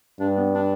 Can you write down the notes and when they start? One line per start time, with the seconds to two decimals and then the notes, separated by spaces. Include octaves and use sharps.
0.20 G2 D4
0.37 B3
0.55 D4